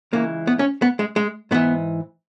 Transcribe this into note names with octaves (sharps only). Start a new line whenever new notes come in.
C#2 C#3 E3 A#3
B3
C#4
B3
G#3
G#3
G#2 E3 B3